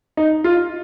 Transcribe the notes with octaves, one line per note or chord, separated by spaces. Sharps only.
D#4
F4